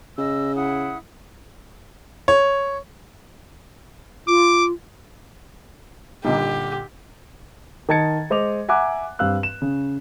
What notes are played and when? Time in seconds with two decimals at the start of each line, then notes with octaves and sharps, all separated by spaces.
0.18 C#3 D#5 E6
0.56 E4 F#5 D#6
2.28 C#5
4.28 F4 D6
6.25 G2 A#2 D3 D#4 G4
7.89 D#3 D#5 A5 G#6 A6 C#7
8.30 G#3 C5 D#5 D6 F7
8.69 E5 F#5 G#5 A#5 D6 F#6
9.19 G2 C4 G4 F5 E6 F#6
9.43 E7
9.62 C#3